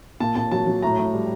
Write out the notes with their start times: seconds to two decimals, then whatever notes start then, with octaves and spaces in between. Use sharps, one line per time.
0.20 A#2 A5
0.35 A#2 A5
0.51 F#3 A5
0.67 F#3
0.82 A2 A#5
0.98 A2
1.14 G3